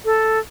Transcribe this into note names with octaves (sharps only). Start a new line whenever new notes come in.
A4